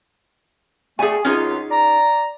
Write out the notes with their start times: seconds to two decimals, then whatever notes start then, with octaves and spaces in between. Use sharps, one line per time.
0.99 G3 A3 G#4 G#5
1.25 C#2 F#2 C#4 D#4 F4 G#4
1.71 D5 A#5